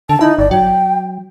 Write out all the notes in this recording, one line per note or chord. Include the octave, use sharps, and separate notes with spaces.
D3 A5
D#4 E4
G1 D5
F#3 G5